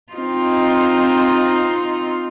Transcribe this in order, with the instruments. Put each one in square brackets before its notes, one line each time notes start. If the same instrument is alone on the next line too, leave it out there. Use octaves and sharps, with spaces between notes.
[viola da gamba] C4 D#4 F4